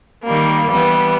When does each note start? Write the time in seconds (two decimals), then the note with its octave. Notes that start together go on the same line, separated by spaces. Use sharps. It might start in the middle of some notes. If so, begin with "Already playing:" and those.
0.24 D#3 G3 A#3
0.70 E3 G3 B3